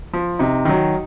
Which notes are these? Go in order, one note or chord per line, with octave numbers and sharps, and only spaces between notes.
F3
C3 D#4
D#3 F#3